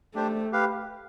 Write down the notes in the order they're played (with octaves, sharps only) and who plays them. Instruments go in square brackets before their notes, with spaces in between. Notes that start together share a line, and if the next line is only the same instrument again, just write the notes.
[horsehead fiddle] A3 [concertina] D4 G4 C5
[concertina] G4 B4 F5